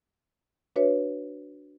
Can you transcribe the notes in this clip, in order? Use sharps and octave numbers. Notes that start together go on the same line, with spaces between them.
D4 F#4 B4 C#5 E5